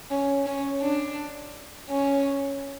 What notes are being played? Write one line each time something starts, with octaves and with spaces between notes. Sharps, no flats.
C#4
C#4
D4
C#4